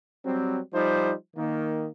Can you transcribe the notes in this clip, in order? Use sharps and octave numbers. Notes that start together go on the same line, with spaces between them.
F#3 G3 C4
F3 G3 D#4 C5
D#3 A#3